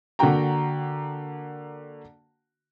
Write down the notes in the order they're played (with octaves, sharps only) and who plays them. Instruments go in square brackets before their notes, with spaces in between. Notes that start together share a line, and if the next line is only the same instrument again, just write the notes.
[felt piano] D3 A#3 F#4 G5 A#5